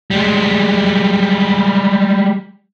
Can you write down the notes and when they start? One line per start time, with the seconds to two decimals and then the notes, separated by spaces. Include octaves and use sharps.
0.11 G3 G#3